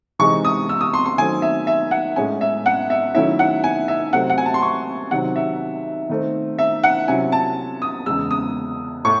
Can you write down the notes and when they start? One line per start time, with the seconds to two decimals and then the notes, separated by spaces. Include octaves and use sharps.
0.19 C3 E3 G#3 D#4 C#6
0.45 D#6
0.69 E6
0.81 D#6
0.94 C6
1.06 C6
1.18 D#3 F#3 A3 C4 G#5
1.42 E5
1.67 E5
1.91 F#5
2.16 A2 G#3 C#4 G#5
2.41 E5
2.66 F#5
2.90 E5
3.14 D#3 F#3 A3 C#4 E4 E5
3.39 F#5
3.64 G#5
3.88 E5
4.13 C3 F#3 A3 C4 F#5
4.30 F#5
4.38 G#5
4.45 A5
4.54 C6
4.62 C#6
5.11 C3 D#3 F#3 C4 F#5
5.36 E5
6.10 D#3 A3 C4
6.58 E5
6.83 F#5
7.08 C3 F#3 C#4 E4 G#5
7.32 A5
7.82 D#6
8.06 E2 C#3 G#3 E6
8.31 D#6
9.05 A2 C#6